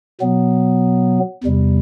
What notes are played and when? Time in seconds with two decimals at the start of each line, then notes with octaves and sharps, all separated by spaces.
0.20 B2 F#3 B3
1.44 E2 C3 G3